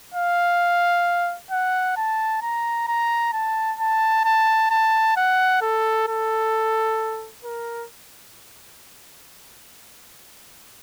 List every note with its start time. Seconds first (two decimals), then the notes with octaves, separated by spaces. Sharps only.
0.14 F5
1.51 F#5
1.97 A5
2.42 A#5
2.88 A#5
3.33 A5
3.79 A5
4.24 A5
4.71 A5
5.17 F#5
5.62 A4
6.08 A4
7.45 A#4